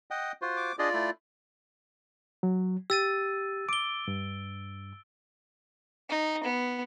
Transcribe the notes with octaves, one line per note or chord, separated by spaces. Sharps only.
D#5 F#5 G5
F4 F#4 C5
D6
D4 F4 G#4 D5 D#5
A3 E4 B5
F#3
G4 E6 A6 D#7
D6 D7 G7
G2
D#4
B3